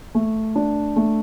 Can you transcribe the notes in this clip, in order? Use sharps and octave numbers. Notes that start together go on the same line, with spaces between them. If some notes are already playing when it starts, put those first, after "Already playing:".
A3
D4
A3